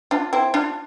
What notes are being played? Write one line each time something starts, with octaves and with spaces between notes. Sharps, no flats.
D4 F4
C4 E4
D4 F4